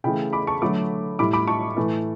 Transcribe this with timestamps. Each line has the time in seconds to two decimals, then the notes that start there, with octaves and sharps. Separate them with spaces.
0.04 C#3 E3 A3 G5 B5
0.33 B5 D6
0.47 A5 C#6
0.62 D3 F#3 A3 B5 D6
1.19 A2 G3 B5 D6
1.33 B5 D6
1.47 A5 C#6
1.77 A2 E3 A3